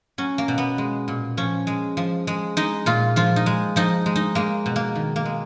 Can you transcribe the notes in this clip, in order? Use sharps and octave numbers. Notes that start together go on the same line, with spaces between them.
F#3 C#4
A#3
B2
B3
G#3
A#2
F3 C#4
G#3
F3
G#3
G#3 D#4
A#2 F4
F3 F4
D#4
G#3
F3 D#4
G#3
D#4
G#3 A#3
B2
A#3
D#3
A#3
G#3